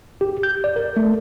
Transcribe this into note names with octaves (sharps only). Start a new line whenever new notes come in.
G4
G6
D5
A#4
A3